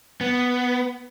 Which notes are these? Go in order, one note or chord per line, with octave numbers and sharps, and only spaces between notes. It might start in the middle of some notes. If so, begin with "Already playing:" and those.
B3